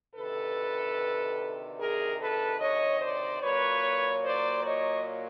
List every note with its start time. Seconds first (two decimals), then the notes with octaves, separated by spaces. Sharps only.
0.15 D2 C3 D#3 A4 B4
1.79 G#4 A#4
2.19 A4 B4
2.60 C#5 D#5
3.01 C5 D5
3.42 A#2 F#3 A#3 B4 C#5
4.24 C5 D5
4.65 C#5 D#5